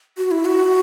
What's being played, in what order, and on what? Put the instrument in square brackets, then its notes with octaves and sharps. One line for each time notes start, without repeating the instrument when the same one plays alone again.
[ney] F#4
E4
F#4